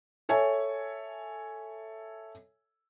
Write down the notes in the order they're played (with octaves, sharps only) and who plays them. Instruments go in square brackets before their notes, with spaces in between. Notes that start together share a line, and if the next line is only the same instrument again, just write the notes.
[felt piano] A4 C#5 E5 G#5